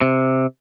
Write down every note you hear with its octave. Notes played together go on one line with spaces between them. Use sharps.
C3